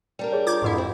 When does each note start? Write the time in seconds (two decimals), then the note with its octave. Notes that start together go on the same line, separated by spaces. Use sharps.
0.19 G3 D4 A#4
0.33 G#4 C#5
0.47 F4 D6 G6 G#6
0.62 F2 G#2 E4
0.78 C4